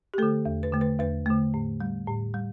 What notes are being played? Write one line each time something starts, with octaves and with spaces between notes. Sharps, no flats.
G4
D3 A3 A4
E2
B4
D3 A3
B4
E2 B4
D3 A3
A2
G3
A2
G3